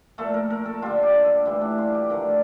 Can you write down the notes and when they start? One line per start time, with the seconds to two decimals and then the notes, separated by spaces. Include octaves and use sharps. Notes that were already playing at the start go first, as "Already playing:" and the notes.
0.18 A#2 F3 A3 A4
0.34 A#4
0.50 A#4
0.66 A4
0.82 D3 G3 F4
1.03 G4
1.24 A4
1.46 A2 E3 G3 E4
1.61 D4
1.78 F4
1.95 G4
2.10 D3 F3 A3 A#4